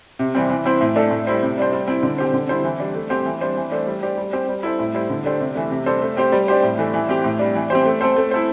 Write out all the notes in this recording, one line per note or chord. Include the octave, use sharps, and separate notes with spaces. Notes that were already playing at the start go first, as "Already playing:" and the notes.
C3
E3 G3 C4
E3
C4 E4 C5
A2
A3 D4 A4
A2
G3 E4 C5
C3
G3 D4 C5
G3
C4 E4
D3
C4 G4 C5
D3
G3 E4 C5
E3
G3 D4
A3
C4 G4 C5
E3
G3 D4 C5
E3
A3 D4 C5
G3
D4 G4 C5
G3
C4 G4 C5
G3
E4 A4 C5
A2
G3 E4 C5
D3
A3 D4 G4 C5
C3
E3 A3
C3
G3 D4 A4 C5
A3
C4 G4 C5
G3
D4 G4 C5
A2
E3 A3 D4
E3
C4 G4
A2
G3 D4
E3
C4 G4 C5
A3
C4 A4 C5
A3
E4 A4 C5